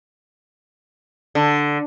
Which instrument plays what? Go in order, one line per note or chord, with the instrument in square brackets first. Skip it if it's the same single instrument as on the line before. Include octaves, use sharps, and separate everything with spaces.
[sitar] D3